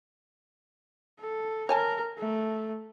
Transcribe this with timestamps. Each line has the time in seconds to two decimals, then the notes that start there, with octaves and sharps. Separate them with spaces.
1.21 A4
1.69 A#4 C#5 G#5 A5
2.18 A3